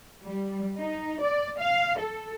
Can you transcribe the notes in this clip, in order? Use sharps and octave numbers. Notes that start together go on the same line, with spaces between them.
G3
D#4
D5
F5
A4